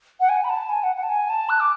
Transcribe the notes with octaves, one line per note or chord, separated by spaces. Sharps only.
F#5
G#5
B5
A5
G#5
F#5
F#5
A5
G#5
A5
F#6
D6